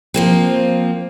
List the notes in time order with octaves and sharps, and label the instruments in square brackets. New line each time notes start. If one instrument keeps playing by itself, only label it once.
[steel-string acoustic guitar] F3 A#3 C4